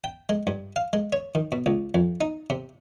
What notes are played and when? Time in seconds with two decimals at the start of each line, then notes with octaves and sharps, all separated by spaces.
0.04 G5
0.29 G#3
0.47 G2
0.76 F5
0.93 G#3
1.13 C#5
1.35 D#3
1.52 B2
1.66 C#2
1.94 F2
2.21 D#4
2.50 C3